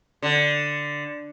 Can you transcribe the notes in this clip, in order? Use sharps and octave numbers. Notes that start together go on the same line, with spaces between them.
D3